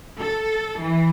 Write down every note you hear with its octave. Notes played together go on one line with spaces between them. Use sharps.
A4
E3